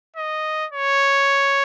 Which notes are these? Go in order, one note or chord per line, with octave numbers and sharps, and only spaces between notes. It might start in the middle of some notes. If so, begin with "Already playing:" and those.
D#5
C#5